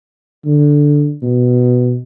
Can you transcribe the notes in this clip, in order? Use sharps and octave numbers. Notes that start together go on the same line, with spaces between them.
D3
B2